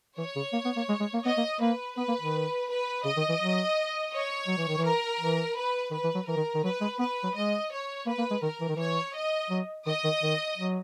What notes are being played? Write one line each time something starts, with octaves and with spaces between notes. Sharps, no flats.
E3 C#5
C#3
A#3
B3
A#3
G#3
G#3
A#3
B3 D#5
A#3
A#3 B4
B3 B4
A#3
D#3
B4
C#3 D#5
D#3
E3
F#3
C#5
F#3
E3
D#3
E3
A#4
E3
B4
D#3 B4
E3
F#3
E3 A#4
D#3
D#3
F#3 B4
G#3
B3 B4
F#3
G#3 D#5
C#5
A#3 B4
A#3
G#3
D#3 A#4
E3
D#3
E3 C#5
D#5
F#3
D#3 D#5
D#3
D#3
F#3